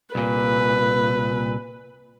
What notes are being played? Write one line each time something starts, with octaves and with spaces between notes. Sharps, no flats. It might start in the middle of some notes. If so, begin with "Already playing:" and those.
C2 A#2 B4